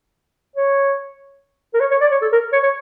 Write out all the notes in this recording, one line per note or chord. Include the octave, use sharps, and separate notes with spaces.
C#5
A#4
C#5
C#5
D5
C#5
A4
A#4
C#5
C#5